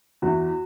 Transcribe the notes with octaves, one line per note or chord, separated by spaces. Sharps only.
E2 E3 F#4